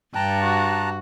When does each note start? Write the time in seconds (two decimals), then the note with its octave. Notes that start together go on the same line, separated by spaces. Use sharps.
0.15 G2 G5 A5 A#5 F#6
0.45 F#4